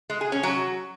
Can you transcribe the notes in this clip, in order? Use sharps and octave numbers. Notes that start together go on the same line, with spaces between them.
G#3
G#4
C#4
F#3